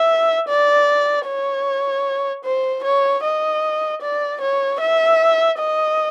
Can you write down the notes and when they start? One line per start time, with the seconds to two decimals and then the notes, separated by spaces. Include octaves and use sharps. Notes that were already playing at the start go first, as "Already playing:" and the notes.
Already playing: E5
0.48 D5
1.27 C#5
2.44 C5
2.84 C#5
3.24 D#5
4.02 D5
4.41 C#5
4.81 E5
5.59 D#5